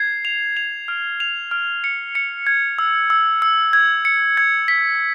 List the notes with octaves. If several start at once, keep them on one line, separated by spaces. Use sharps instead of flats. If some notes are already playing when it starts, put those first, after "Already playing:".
Already playing: G#6 C7
F7
F7
F6
F7
F6
C#7
C#7
G#6
E6
E6
E6
G#6
C#7
G#6
B6